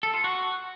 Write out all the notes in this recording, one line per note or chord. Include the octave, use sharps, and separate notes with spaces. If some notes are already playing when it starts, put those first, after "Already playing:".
A4
F4
F#4